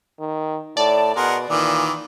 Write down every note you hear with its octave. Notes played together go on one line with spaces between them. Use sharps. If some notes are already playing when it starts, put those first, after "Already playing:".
D#3
A2 D5 A5
B2 G#4 A#4 F#5 C6
A#2 D#3 E3 D6